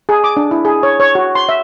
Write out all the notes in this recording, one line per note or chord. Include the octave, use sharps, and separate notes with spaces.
G#4
D6
D4
E4
G#4
C#5
C#5
F#4
C6
E5